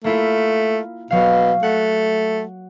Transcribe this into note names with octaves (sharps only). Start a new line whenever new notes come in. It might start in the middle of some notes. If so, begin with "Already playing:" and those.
A3 A#3 E4 F4
B2 F#3 F5
A3 F#5